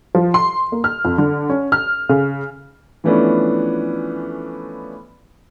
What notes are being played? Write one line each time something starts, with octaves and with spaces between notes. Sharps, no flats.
F3
C6
A#3
F6
F2
D3
C#4
F6
C#3
E3 F3 A3 B3 C#4 D4